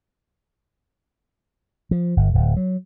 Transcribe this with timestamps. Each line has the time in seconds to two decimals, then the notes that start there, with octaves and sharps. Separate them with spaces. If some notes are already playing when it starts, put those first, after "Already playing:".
1.91 F3
2.17 G1
2.35 D1
2.57 F#3